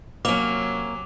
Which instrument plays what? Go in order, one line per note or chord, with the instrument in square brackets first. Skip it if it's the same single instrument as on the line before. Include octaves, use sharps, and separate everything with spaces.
[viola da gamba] C3 F#3 [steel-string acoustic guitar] A#3 C#4 [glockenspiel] D6 F7